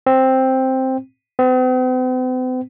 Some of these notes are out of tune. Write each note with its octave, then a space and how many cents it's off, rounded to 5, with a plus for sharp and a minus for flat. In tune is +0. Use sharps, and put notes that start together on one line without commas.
C4 +5
C4 -45